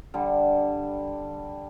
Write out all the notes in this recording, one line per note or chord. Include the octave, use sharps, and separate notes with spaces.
D3 G3